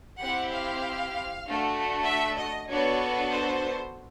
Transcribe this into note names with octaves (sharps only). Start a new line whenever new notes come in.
C4 E4 G4 F#5
F5
A3 D4 F#4
E5
D#5
B3 D4 F#4 A4 C#5
C5